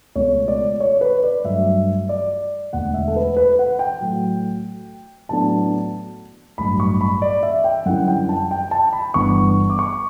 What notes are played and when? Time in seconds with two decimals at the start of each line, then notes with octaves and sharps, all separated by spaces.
0.15 C#2 B2 A3 C#5
0.48 D5
0.80 C#5
1.01 B4
1.23 D5
1.44 G2 F#3 A3 E5
2.09 D5
2.73 E1 D2 D3 F#5
2.94 E5
3.08 A4
3.16 B4
3.37 B4
3.59 F#5
3.79 G5
4.01 A2 F#3 A3
5.29 A2 F#3 B3 D4 A5
6.58 A1 G2 F#3 B5
6.80 C#6
7.01 B5
7.22 D5
7.43 E5
7.64 G5
7.86 F#2 D3 G3 C#4 E4 F#5
8.08 G5
8.29 A5
8.51 G5
8.71 A5
8.93 B5
9.14 G1 G2 E3 B3 D4 C#6
9.70 D6
9.79 C#6